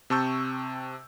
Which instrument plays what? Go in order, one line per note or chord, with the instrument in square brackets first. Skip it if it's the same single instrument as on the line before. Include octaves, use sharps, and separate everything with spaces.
[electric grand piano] C3 C4 A5 C#6 E6 G6